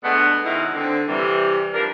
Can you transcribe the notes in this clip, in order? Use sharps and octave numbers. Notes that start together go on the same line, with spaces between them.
B2 G#3 A3 B3 D4
B2 D#3 G#3 C#4 D#4 E4
D3 C4
C3 E3 G3
F3 G3 D4 A#4